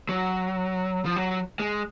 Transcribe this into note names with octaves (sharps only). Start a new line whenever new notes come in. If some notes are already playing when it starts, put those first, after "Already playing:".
F#3
F3
F#3
G#3